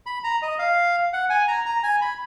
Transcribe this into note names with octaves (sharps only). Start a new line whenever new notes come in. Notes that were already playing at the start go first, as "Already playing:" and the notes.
B5
A#5
D#5
F5
F#5
G#5
A#5
A#5
G#5
B5